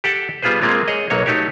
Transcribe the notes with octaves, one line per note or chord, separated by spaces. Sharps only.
G4 A4 F#5 G5 A5
G3 B3 F4 G#4 B4 C5
G#3 A#3 C4 F4
G#4 C#5 D#5
B1 F#3 A#3 C#5
A3 D#4 F#4 G4 C#5